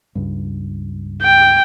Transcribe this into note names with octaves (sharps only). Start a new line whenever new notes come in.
C#2 G2
G5